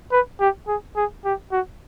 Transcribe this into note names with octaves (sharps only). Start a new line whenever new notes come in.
B4
G4
G#4
G#4
G4
F#4